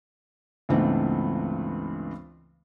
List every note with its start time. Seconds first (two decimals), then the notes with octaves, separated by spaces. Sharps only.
0.69 C#2 G2 E3 A3 B3 C4